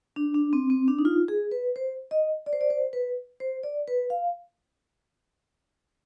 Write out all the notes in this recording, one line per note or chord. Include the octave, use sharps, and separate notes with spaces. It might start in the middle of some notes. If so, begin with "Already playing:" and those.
D4
D4
C4
C4
D4
D#4
F4
G#4
B4
C5
D#5
D5
C5
D5
C5
B4
C5
D5
B4
F5